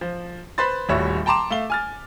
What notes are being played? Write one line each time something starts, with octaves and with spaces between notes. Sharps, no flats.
F3
B4 C5 B5 C6 A6
D#1 A2 G3 F#4 C#5 E5
G5 A5 A#5 C6 D6 E7
A3 F5 G7
G#5 F6 A6